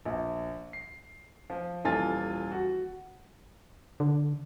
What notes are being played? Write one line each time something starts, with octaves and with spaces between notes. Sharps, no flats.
A#1
C7
F3
D#1 E3 F4 A4 G#5 A6
F#4
D3